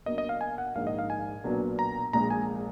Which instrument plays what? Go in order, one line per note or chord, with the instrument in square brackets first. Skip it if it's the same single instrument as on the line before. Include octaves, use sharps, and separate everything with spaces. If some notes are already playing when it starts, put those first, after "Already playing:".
[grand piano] B1 B2 A#3 D4 [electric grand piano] D#5
[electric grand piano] D#5
F5
G#5
F#5
[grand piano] A#1 G#2 D#3 A#3 [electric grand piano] F5
[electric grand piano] D#5
F5
G#5
[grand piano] B1 A#2 F#3 B3 D4
[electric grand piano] A#5
[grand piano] A#1 A#2 G#3 [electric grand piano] A#5
[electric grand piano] G#5